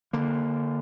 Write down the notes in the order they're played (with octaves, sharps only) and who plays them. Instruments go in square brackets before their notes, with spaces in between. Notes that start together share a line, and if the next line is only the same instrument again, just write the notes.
[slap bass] D3 A#3